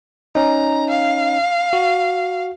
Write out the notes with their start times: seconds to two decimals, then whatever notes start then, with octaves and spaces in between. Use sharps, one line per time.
0.35 C#4 D#4 A#5
0.89 F5
1.73 F#4